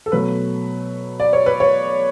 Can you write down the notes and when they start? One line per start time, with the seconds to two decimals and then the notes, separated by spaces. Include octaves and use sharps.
0.06 A4
0.12 B2 F#3 A3 B4
1.20 D5
1.33 C#5
1.46 B4
1.60 C#5